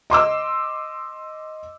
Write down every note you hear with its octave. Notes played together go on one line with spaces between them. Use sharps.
D#5 C6 D6 E6